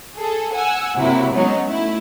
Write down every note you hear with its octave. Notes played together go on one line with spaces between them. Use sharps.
G#4 A4
F#5 G#5 E6
C3 F#3 A#3 E4 F#4
F#3 G#3 B3 C#4 D#4
A3 E4